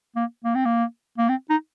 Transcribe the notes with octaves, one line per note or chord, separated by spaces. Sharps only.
A#3
A#3
C4
A#3
A#3
C4
D#4